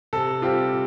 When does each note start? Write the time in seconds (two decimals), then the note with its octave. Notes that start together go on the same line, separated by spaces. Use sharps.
0.13 C3 A4
0.42 G3 C4 F4 G4